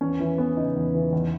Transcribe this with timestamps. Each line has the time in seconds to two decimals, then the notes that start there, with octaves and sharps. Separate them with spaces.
0.01 E2 C#4
0.20 E3
0.38 B3
0.57 C#3 D#4
0.76 E2
0.94 E3
1.13 E2